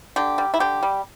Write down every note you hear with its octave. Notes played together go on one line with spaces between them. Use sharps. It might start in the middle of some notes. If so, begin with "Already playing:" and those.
D3 G4
G3
E4
D3 G4
G3